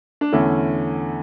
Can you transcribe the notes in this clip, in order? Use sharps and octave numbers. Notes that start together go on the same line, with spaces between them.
D4
E2 D3 A3 C#4 E4